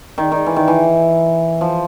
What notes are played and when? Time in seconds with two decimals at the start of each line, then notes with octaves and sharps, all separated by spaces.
0.18 D#3
0.32 D#3
0.46 E3
0.56 D#3
0.68 E3
1.61 F3